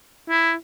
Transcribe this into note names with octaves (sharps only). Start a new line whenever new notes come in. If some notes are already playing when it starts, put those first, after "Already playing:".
E4